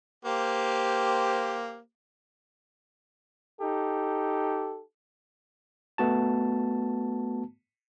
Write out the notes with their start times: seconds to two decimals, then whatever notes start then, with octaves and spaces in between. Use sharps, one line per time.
0.25 A#3 G4 C5
3.61 D#4 G4 A4
5.98 A3 B3 F#4 A5